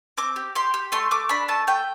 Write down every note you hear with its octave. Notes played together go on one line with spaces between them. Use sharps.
C4 D6
G4
G4 C6
G4
A3 C6
A3 D6
D4 B5
A3 A5
A3 G5